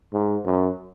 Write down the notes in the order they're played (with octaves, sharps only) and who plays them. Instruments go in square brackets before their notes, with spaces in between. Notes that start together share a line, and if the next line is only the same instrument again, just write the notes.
[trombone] G#2
F#2